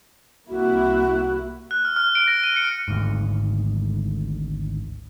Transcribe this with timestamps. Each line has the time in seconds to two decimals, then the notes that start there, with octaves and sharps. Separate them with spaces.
0.50 C2 A#3 E4 F#4
1.71 F#6
1.85 F6
1.96 F6
2.15 D7
2.28 A#6
2.43 D#7
2.56 C#7
2.88 G#1 D2 G#2